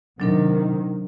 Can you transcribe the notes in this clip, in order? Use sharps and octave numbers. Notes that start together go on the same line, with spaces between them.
C3 D#3 F#3 D4 A#4